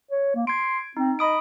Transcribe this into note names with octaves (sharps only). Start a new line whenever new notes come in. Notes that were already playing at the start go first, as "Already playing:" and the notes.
C#5
A#3
C6 G#6 D7
C4 D#4
D#5 B5 D#6 D7